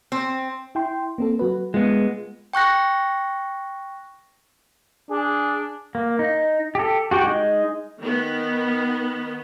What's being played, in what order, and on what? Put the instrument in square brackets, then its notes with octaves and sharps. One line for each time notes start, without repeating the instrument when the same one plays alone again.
[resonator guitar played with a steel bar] C4
[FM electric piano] E4 G5 C6
A#3 C4 A4
F#3 F#4 B4
[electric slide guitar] G#3 B3 [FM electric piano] F4
[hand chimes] G5 C#6 F#6 A#6
[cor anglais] D4 [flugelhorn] G#4
[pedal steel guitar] A#3
D#4
G4 A4
F#4 G4 G5
G#3 D#4
[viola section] D#3 B3